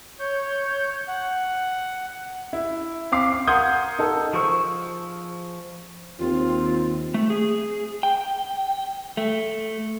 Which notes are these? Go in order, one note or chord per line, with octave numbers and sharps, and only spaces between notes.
C#5 G6
F#5
E4
C4 F5 D6 C7
F5
A#4 F#5 C6 D#6 G6 G#6
D#4 A4 A#4
F3 G#4 C5 C#6 E6
D#2 C4 F4
A3
G#4
G5
A3